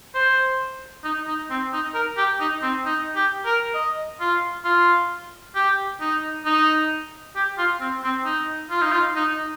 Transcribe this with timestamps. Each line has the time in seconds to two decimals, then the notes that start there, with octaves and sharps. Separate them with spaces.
0.15 C5
1.04 D#4
1.28 D#4
1.51 C4
1.73 D#4
1.94 A#4
2.18 G4
2.40 D#4
2.63 C4
2.85 D#4
3.16 G4
3.46 A#4
3.75 D#5
4.21 F4
4.65 F4
5.55 G4
6.01 D#4
6.45 D#4
7.36 G4
7.58 F4
7.81 C4
8.03 C4
8.25 D#4
8.70 F4
8.82 D#4
8.92 F4
9.16 D#4